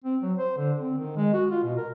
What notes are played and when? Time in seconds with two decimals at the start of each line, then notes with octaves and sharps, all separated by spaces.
0.04 C4
0.22 F#3
0.39 C5
0.58 D3
0.79 C4
0.97 D#3
1.17 G#3
1.34 F#4
1.51 F4
1.63 B2
1.77 A#4